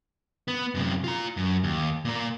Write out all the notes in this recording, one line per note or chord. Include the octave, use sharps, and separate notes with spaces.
B3
F#2 C3
F4 A#5
F#2
D#2
A#2 A#4